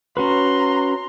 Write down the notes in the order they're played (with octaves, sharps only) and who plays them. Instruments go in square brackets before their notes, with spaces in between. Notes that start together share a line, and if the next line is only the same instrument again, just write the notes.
[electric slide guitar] C#4 F#4 B4 [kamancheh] A#5 C6